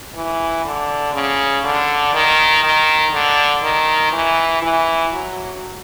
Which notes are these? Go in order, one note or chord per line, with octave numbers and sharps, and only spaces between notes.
E3
D3
C#3
D3
D#3
D#3
D3
D#3
E3
E3
F#3